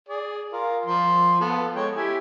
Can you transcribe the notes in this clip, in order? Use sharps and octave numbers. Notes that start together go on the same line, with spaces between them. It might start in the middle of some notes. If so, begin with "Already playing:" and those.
G#4 D5
F4 A#4
F3 C6
B3 F4 A4
G#3 C#5 G5
E4 G4 G#5